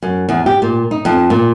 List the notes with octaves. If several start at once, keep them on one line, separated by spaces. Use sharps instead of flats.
F#2
E2
G4
A#2
D#4
F2
A#2